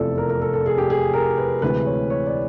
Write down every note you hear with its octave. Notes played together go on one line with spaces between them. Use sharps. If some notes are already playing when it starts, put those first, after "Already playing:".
Already playing: F1 E2 C3 F3 A4 D5
A#4
A#4
A4
A4
G#4
G4
G#4
A#4
B4
D2 C3 E3 G#3 B4
C#5
C#5
D5